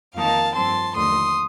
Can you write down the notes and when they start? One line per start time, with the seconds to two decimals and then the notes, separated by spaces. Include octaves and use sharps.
0.15 F2 D#3 A#3 D#4 F5 A5
0.54 G2 F3 C4 A5 C6
0.95 D#2 D3 F3 A3 C6 D#6